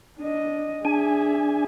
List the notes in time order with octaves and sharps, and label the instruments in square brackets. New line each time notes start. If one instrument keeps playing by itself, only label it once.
[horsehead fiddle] D4 D#5
[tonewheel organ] D4 G#5 [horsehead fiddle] G#4 E5